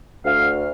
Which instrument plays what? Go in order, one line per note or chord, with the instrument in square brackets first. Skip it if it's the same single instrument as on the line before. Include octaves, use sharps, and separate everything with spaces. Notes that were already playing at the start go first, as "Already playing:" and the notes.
[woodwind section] D2 F5